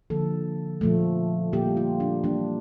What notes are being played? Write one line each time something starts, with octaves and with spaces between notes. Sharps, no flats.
D3 F3 A#3 A4
A#2 F3 A3
A#2 G3 A#3 G4
F4
D4
E3 G3 A#3 D4